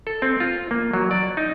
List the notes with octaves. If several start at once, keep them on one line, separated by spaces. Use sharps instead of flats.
A4
C4
F4
A#3
F#3
D5
D#4